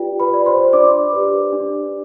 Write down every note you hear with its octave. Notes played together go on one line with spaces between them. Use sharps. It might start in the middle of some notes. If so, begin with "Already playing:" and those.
Already playing: F4 G4 B4 D5 G5
B4 B5
B4 D5
C5 C6
D4 D5 D6
G4 B4
D4